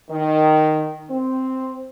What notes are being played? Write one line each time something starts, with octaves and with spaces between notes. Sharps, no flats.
D#3
C4